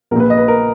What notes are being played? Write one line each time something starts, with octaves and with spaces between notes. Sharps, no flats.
A#1 A#2 A#4 B4
D#5
B4
A#4